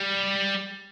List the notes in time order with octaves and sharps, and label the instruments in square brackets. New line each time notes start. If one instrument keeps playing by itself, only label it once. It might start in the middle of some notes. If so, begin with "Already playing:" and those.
Already playing: [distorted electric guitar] G3